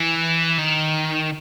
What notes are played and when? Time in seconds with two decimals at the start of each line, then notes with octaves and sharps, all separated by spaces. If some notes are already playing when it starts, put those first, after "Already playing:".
Already playing: E3
0.58 D#3